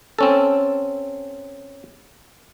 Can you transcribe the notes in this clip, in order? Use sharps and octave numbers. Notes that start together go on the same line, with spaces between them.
C4 C#4 A4